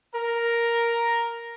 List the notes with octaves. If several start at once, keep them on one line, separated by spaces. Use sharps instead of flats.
A#4